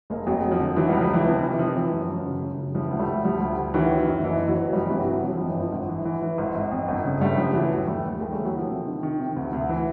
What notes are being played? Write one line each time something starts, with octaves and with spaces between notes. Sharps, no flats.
F1 G#3 A#3
F2 F#3 G#3
F1
F3
D3
D#3 E3 F#3
C#2 F3 G3
F3
C#2 E3
C3 F3
C3 E3
D#3 F3
E3
F#2
F3
F#2
C#3
F#2
C#3
E3 F3 G3
D2
G3 A3
D2
D2 F3 G3
D2
D2
D#3 E3 F#3
D#3
F#2
F#1 E3
F#1
E3 F#3
F#1
G1 F3 G3
C3 E3 F#3
G1 E3 F#3
G1 F3
F2 F3
E3
G1 F3
G#1
E3
E3
E3
G#1
G#1
F2
G1
C#3
G1 G3 A3
C#3 F3
G1 E3 F#3
D#2
D#2 G3 A3
D#2
D#2 G#3 A#3
D#2 G3 A3
E3 F#3
D3 F3
C3
D#3
D#3
C3
D2
D2
E3